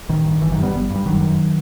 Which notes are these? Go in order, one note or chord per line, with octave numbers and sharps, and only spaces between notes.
A1 D#3
G2
G1 E3
D#3 F#3
G2
G3 B3
G1
G2
G3
F#1 D#3 F#3
F#2